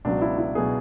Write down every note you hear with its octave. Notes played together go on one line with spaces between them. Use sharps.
C#2 B2 F#3 D4
E4
E4
B2 F#3 G#4